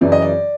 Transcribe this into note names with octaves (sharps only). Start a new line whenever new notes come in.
F#2 C#3 E3 D5
D#5
D5